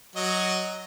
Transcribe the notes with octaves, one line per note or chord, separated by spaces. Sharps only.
F#3 F#4 D#5